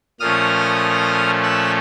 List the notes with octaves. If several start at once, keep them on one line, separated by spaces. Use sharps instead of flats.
A#2 F3 A3 C#4 D#6 F6
E6 F#6